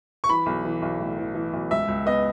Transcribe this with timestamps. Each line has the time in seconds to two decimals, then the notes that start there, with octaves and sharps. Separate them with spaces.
0.24 C#6
0.29 E3 B5
0.46 B1
0.65 E3
0.82 B1
0.99 A2
1.18 E3
1.35 E3
1.53 B1
1.71 C#2 E5
1.88 C#2
2.06 B3 D#5